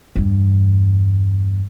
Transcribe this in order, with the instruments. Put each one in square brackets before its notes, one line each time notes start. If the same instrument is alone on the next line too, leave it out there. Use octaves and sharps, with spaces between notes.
[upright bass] E2 G2